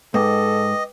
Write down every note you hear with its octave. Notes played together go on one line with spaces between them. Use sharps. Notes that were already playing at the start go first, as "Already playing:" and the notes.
G#2 A4 B4 D#5 G5 D6